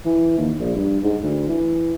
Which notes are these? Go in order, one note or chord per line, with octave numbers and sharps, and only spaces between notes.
E3
D#2
A#1
G2
G#2
D2
E3